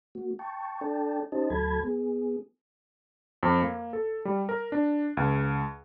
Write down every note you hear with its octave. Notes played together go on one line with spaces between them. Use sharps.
A#3 F#4
G5 A5 C#6
D4 A4 D5 G5 A5
C#4 D#4 G4 C5 D#5 A5
D2 F#3 A4 A5 B5 G#6
B3 G#4
F2
A#3
A4
G3
A#4
D4
C#2